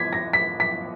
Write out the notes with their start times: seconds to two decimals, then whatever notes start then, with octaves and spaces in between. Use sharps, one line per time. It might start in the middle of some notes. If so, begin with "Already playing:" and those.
Already playing: G#6 B6
0.13 A#6
0.33 B6
0.60 B6